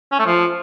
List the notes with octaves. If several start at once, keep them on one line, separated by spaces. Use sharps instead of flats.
C#4
A3
F3